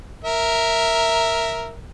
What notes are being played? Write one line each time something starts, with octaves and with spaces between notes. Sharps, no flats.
A#4 E5